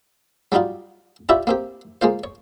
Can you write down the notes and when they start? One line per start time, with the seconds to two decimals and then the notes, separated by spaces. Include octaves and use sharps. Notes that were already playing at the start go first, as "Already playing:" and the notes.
0.52 F#3 G3 D4 D#4 F4
1.29 D4 E4 F4 G4 C#5 E5
1.47 A#3 C4 G4
2.02 G#3 A#3 F4 C5
2.24 C#5